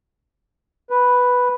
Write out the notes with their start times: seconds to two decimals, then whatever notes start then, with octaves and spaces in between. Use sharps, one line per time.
0.90 B4